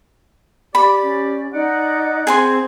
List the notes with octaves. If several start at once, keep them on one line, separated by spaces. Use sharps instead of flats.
G4 D5 B5
C#4
D#4 D5 F#5
C4 G#4 G#5 C6